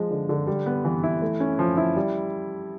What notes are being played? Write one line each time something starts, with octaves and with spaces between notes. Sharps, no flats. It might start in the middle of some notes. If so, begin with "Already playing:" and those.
Already playing: F3 G#3
D3
D3
G3
B3
E3
E4
A3
C#4
F3
E4
G3